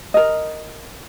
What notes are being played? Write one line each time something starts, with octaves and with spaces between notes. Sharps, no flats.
A#4 D#5